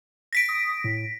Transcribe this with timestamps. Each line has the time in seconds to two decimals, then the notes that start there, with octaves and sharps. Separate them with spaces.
0.33 A#6 B6 D7
0.49 D#6
0.84 A2